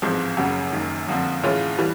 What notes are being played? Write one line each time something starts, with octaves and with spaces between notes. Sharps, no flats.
A1 G#2 F3 G#3 C4
F#1 F#2 C#3 F#3 B3
F#1 F#2 D#3
F#1 F2 D3 F3
A2 E3 G#3 C#4 F4
E3 G3